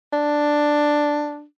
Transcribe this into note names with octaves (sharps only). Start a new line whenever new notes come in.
D4